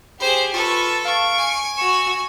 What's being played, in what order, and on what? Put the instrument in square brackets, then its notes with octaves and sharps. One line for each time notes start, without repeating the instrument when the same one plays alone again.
[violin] G4 G#4 [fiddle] C5
[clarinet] F4 [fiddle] A4 B4 [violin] C#6
[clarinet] F5 [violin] C#6 D7
[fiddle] G#5
[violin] F#4 E6 [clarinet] C#6